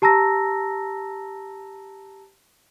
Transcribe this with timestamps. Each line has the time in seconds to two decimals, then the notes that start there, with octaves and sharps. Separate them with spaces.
0.02 G4 A5 A#5 E6 A#6